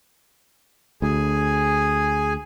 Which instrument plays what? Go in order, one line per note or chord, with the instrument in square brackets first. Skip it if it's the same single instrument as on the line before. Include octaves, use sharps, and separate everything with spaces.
[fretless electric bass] D2 [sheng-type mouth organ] G#4 G#5